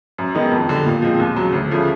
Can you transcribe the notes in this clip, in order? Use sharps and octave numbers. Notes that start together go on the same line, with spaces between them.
F#2
D#3 G#3 B3 D#4
F2
D3 G3
A#2
F3 G#3 C4
D#2
C#3 F#3
D2
C#3 F3 A3